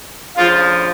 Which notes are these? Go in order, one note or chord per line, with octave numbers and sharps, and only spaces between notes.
D2 C#3 F3 F4